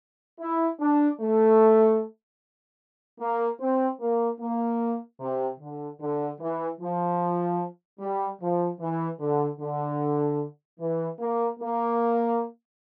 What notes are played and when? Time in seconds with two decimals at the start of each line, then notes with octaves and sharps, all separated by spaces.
0.40 E4
0.80 D4
1.20 A3
3.20 A#3
3.60 C4
4.01 A#3
4.40 A#3
5.20 C3
5.60 D3
6.00 D3
6.40 E3
6.80 F3
8.00 G3
8.41 F3
8.80 E3
9.20 D3
9.60 D3
10.80 E3
11.20 A#3
11.60 A#3